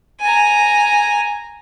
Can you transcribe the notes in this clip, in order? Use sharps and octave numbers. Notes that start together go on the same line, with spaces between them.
G#5 A#5